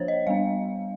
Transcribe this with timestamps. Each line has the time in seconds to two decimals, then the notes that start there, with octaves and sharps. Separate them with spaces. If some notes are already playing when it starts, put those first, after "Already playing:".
Already playing: F3 A#3 D4 C5 C#5
0.08 D#5
0.27 G3 B3 D4 F5